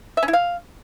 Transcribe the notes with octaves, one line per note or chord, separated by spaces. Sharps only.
E5
C#4
E4
F5